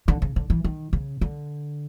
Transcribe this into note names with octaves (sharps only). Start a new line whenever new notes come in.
D3
C#3
D3
E3
D#3
C#3
D3